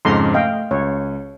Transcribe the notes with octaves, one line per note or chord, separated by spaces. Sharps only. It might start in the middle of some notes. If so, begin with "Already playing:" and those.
F2 G#2 C#3 A4 A#5 C6
A3 D#5 F5 G5
C#2 C#5